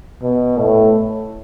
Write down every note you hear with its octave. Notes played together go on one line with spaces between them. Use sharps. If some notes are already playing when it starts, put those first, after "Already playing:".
B2
A2